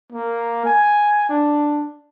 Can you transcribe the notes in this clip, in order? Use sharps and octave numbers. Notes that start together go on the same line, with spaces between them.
A#3
G#5
D4